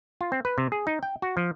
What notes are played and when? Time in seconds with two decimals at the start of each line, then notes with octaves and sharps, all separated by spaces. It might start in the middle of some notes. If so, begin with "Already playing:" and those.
0.21 F4
0.32 C4
0.45 B4
0.58 C3
0.72 G#4
0.87 D#4
1.03 G5
1.22 F#4
1.37 F3